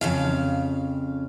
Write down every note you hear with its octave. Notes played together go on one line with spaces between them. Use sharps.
F2 C#3 F5